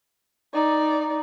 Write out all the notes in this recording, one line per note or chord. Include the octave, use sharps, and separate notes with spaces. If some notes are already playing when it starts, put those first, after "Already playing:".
D#4 D5